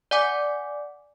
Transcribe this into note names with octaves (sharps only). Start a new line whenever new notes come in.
D5 F#5 G#5 D6